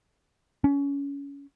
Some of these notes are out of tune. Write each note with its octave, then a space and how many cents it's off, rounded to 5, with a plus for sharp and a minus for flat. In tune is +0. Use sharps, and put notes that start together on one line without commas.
C#4 +25